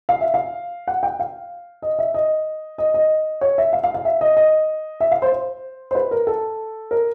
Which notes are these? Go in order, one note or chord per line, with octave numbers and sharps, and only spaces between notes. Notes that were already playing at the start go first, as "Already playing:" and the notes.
F5
E5
F5
F#5
G5
F5
D#5
E5
D#5
D#5
D#5
C#5
E5
F5
F5
F5
E5
D#5
D#5
E5
F5
C5
C5
C5
B4
A#4
A4
A#4